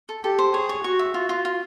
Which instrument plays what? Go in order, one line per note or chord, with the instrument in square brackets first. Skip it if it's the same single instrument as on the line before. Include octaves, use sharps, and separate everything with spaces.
[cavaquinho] A4
[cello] G4 [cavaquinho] A4
[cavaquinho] C5
[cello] G#4 [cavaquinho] C#5
[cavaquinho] C#5
[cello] F#4 [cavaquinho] C#6
[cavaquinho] E5
[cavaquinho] F4 [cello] F#4
[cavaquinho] F4
F4